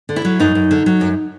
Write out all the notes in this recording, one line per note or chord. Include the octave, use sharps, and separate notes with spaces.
D3
E4
F#3
F#2 D#4
F#2
D3
F#3
F#2